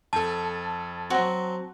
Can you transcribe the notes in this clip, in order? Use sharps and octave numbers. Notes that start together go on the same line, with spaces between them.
F2 A4 A5
F#3 C4 F#4